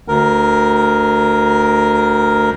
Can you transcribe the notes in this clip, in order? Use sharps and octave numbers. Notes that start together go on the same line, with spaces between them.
D2 A#4